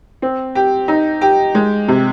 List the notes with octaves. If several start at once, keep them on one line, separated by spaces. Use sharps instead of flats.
C4
G4
D#4
G4
G#3
C3